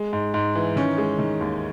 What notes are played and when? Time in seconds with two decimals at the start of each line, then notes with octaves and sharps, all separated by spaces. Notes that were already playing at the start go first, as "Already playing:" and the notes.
Already playing: G#3
0.13 G#2
0.34 G#2
0.55 E3
0.76 D#3 C#4
0.98 G#3
1.19 D#3
1.41 D#2